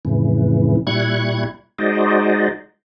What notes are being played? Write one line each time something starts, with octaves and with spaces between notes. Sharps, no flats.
F2 A2 C#3 E3
A#2 G3 E4 C#6 F#6 G#6
G#3 D#4 F#4 C5 D5 D#5